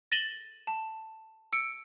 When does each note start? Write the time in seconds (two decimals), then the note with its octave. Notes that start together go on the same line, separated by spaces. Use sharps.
0.12 A6 A#6 D#7 E7 F#7 G7
0.67 A5
1.53 E6 C#7 D7